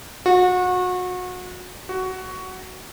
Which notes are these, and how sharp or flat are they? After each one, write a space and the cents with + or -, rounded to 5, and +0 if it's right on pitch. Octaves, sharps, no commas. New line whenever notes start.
F#4 -30
F#4 +10